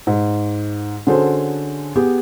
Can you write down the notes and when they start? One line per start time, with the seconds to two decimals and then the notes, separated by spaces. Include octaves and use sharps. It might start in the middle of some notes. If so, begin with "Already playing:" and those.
0.07 G#2
1.07 D3 C#4 F#4 G#4 A4 C5
1.96 B3 G4 G#4